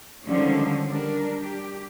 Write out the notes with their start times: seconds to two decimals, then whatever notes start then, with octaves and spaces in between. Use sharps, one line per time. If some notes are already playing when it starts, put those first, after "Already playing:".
0.24 D3 D#3 F3 G3 G#3 C#4
0.88 G3 D4 A#4
1.38 G4